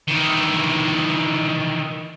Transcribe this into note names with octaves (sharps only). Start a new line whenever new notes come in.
D#3 E3